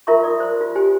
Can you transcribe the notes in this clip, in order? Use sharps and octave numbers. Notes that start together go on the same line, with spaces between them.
F4 A#4 E5 A#5 C6 C#6
D5 D#6
C5 C6
F4
G4 C5 G#5